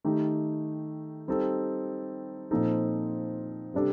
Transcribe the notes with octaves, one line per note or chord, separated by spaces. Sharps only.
D#3 A3 D#4 G4
G3 C4 D#4 A4
A#2 F3 C4 D#4 A4
C3 G3 D4 A4